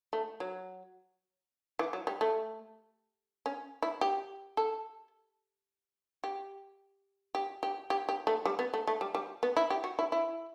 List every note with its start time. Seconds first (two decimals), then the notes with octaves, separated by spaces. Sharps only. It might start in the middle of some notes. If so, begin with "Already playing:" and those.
0.13 A3
0.40 F#3
1.79 E3
1.93 F#3
2.07 G3
2.21 A3
3.46 C#4
3.82 E4
4.01 G4
4.57 A4
6.24 G4
7.35 G4
7.63 G4
7.90 G4
8.09 G4
8.27 A3
8.45 G3
8.59 B3
8.74 A3
8.87 A3
9.01 G3
9.15 G3
9.43 B3
9.57 E4
9.70 G4
9.84 F#4
9.99 E4
10.12 E4